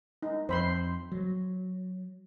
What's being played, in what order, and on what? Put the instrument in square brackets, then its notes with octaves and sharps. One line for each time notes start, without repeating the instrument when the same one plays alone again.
[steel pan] D#4
[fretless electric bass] F2 [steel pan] C5 B5 C6
[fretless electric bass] F#3